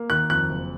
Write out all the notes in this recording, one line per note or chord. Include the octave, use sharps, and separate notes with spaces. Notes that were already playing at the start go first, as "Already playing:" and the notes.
Already playing: A#3
D#3 F#6
F2 F#6
F#1